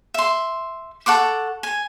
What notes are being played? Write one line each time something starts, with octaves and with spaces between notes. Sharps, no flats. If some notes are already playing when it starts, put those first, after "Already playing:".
E5 C6
A4 F#5 C#6 D6
G#5